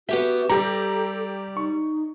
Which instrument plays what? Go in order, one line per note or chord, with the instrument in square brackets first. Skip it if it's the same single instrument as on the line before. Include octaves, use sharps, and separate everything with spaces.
[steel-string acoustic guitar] B3 G4 E5 [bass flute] F#4
[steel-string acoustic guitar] G3 [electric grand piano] G4 A#5 [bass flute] A4
[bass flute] D#4 [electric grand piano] C#6